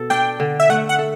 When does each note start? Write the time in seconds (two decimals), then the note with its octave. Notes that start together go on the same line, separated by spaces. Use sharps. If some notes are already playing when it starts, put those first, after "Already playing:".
Already playing: B2 A4
0.10 D4 G5
0.40 D3
0.60 E5
0.70 A3 F#5
0.89 F#5
0.99 A4